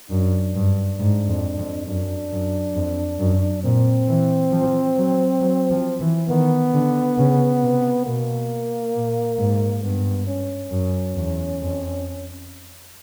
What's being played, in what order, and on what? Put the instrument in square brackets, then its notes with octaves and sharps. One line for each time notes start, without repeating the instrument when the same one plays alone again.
[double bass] F#2 [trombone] D4
[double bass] G2
G#2
F2
F2
[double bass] F#2 [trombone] D4
[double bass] F#2
F2
F#2
[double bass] A#2 [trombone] C4
[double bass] E3
F3
F#3
F#3
F3
E3
[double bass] D#3 [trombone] B3
[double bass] D3
C#3
C3
[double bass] B2 [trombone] A#3
[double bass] A#2
G#2
[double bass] G2 [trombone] B3
[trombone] C#4
[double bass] F#2
E2
F2